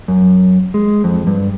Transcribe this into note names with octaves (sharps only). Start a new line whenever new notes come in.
F#2
G#3
F2
G2